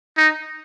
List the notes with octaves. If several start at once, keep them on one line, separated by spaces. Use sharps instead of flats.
D#4